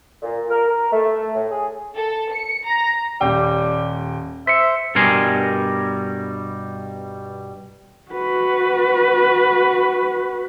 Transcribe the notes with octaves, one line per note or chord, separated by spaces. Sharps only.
A#2
A#4
A#4
A3
A2
G#4
A4
C#7
A#5
D#1 G3 G5
C5 E5 B6 C#7
G2 B2 G3 A#4 G#5 C6
F#4 B4